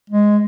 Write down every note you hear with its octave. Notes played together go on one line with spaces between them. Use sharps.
G#3